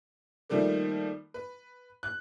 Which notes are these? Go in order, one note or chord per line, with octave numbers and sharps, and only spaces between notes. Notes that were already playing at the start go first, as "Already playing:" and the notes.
D#3 F3 G3 A3 A#3
B4
F#6